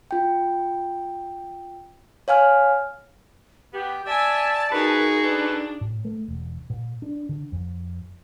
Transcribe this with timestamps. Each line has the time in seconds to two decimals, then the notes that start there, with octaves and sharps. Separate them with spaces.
0.11 F4 G5
2.28 C#5 F5 G#5 F6
3.73 B3 G4
4.07 D5 E5 G#5 A5
4.71 D#4 F#4 G#4 A#4 B4
5.23 D4 A4 B4
5.81 A2
6.05 A3
6.28 E1
6.70 A#2
7.02 D4
7.29 D3
7.52 F2